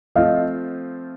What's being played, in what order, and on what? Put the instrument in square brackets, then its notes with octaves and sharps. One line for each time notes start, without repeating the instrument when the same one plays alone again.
[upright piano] F3 A3 C4 F4 [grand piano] D#5 F5